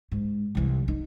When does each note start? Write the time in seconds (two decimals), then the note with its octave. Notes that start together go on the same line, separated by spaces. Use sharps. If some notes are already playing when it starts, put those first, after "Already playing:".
0.12 G#2
0.55 C2 E3
0.88 D#4